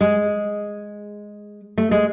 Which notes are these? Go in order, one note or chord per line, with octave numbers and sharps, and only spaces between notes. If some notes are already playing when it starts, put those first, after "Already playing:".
G#3
A3
G#3